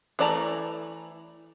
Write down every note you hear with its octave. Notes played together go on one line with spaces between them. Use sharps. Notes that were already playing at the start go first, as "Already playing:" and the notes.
E3 A3 D5 A5 A#5